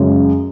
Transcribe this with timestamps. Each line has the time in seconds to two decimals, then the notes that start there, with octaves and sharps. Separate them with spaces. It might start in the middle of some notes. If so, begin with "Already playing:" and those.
Already playing: F#2 C#3 G#3